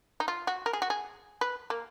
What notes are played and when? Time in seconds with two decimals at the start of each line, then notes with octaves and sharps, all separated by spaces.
0.20 D#4
0.28 F4
0.47 F#4
0.66 A#4
0.73 G#4
0.82 F#4
0.90 G#4
1.41 B4
1.70 A#3